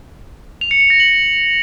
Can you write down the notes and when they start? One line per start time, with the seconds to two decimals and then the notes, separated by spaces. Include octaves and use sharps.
0.61 F7
0.71 C#7
0.81 F7
0.90 A#6
1.00 F#7